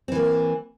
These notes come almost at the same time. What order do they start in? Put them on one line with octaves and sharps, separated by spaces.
C4 E3 A#3